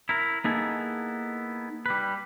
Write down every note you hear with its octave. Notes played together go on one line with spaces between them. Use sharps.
E4 A#4
A#3 B3 D#4 E4 G#4 A4
G3 B4